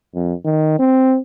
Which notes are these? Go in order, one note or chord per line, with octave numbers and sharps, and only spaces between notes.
F2
D#3
C4